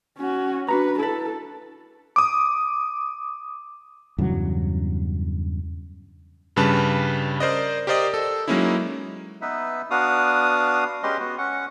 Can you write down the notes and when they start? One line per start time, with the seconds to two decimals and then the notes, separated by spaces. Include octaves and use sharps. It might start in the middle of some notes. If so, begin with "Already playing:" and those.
0.18 C#4 F#4
0.69 D4 F#4 B4 A#5
1.00 E4 A4 B4
2.16 D6 D#6
4.18 E2 G2 C#3 F#3
6.56 G2 C#3 G3 B4 A5 F#6
7.40 A#4 C5 D5 D#5
7.87 G4 A#4 C5 D5 D#5
8.14 A4
8.48 F#3 G#3 A#3 C#4 D#4 E4
9.41 B3 D#4 B4 E5
9.90 B3 D4 F#4 F5 D#6
11.03 G#3 C#4 G4 B4 D#5 C6
11.19 B3 F#4
11.38 C#4 F#5 C#6